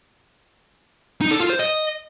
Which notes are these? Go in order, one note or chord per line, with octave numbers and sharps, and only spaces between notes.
D#4
A4
F4
C5
D#5